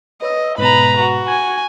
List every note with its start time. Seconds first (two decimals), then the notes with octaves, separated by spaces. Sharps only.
0.22 B4 C#5 D#5 E6
0.58 G#2 B2 B4 A#5 B5
0.98 F#4
1.28 G#5 G#6